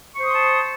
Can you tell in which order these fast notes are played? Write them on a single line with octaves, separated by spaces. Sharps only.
C#6 C5 D#6 C6 A5